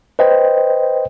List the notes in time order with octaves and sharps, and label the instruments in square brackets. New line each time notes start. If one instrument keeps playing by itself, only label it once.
[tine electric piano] B4 C5 D#5 G5